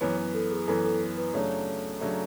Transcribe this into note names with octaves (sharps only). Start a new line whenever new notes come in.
F#2 E3 B3 C#5
B4
A4
G#4
F#2 E3 B3 A4
A4
B4
F#2 C#3 F#3 A3 D4 C#5
C#3 F#3 A3 D4